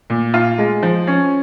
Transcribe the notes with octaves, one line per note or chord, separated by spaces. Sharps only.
A#2
F4
G#3
F3
C#4